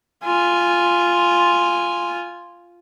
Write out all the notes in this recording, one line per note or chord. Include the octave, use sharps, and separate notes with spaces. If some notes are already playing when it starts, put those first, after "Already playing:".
F4 G#5